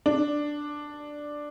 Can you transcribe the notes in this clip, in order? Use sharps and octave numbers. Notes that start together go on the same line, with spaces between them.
D4